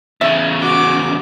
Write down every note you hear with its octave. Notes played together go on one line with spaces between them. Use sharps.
E2 C#3 E5
F#4 D6